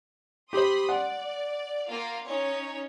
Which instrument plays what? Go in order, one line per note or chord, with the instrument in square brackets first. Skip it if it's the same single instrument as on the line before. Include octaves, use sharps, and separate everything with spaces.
[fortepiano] G4 C5 [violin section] B5 C6 D#6
[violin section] D5 [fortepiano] F#5
[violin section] A#3 F4 F5
C#4 D#4 C#5